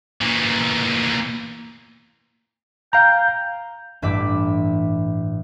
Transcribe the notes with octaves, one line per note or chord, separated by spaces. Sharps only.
A#2 E3
F5 G5 A#5
A1 G2 E5 B5 D6